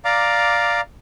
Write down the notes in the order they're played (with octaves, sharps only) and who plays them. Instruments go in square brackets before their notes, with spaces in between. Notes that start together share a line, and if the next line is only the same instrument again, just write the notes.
[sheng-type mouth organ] D5 F5 A#5 D6